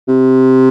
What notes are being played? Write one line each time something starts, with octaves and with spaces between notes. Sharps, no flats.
C3